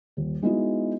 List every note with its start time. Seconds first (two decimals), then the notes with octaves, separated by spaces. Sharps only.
0.17 D#1
0.42 G#3 B3 D#4 E4 F#4